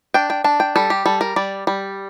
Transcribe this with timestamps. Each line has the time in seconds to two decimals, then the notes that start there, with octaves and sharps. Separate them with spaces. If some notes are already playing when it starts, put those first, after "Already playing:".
0.14 D4 G5
0.30 G5
0.44 D4 A5
0.60 G5
0.76 G3 A4
0.90 G4
1.06 G3 A4
1.21 A#4
1.36 G3 D5
1.67 G3